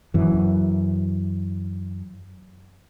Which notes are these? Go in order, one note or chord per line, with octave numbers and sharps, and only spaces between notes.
F#2 E3